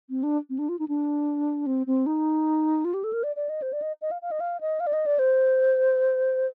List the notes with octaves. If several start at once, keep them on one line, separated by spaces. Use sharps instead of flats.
C4
D4
C4
D4
F4
D#4
D4
C4
C4
D#4
F4
G4
A4
A#4
D5
D5
D#5
C5
D5
D#5
D#5
F5
F5
D#5
F5
D#5
F5
D5
D#5
D5
C5